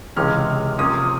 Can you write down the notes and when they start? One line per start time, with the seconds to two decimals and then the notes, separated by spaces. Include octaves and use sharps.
0.16 C#2 C3 E3 G#3 C#4 F6
0.79 C3 F3 A#3 C#4 D#6